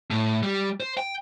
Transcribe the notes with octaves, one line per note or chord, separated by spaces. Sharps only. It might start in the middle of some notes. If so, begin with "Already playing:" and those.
A2
G3
C5
G5